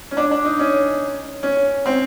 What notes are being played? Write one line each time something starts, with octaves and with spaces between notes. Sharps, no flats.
C#4
D4
D4
D#4
C#4
C#4
C4